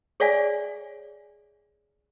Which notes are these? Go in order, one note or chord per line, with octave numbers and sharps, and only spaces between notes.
G#4 C#5 D5 E5 F5 G#5